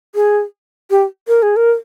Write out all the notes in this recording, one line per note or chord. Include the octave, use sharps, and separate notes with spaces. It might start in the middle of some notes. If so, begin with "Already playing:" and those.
G#4
G4
A#4
G#4
A#4